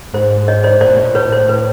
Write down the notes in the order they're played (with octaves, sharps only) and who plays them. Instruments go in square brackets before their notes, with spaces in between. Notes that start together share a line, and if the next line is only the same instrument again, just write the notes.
[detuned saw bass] G#2 [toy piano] C5
[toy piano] C#5 D#5
C5 D5
[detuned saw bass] A2 [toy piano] C5 D5
[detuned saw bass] B2
G#2
B2
A#2
[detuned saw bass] A2 [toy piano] B4 C#5
[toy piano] C5
B4